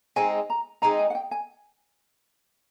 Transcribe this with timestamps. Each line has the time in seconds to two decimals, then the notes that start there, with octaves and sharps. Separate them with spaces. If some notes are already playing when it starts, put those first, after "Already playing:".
0.16 G#3 C4 D#4 G#5
0.50 A#5
0.82 G#3 C4 D#4 A#5
0.99 G#5
1.10 F#5
1.15 G5
1.31 G#5